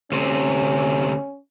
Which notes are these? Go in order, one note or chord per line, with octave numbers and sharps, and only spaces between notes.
D2 C3 C#4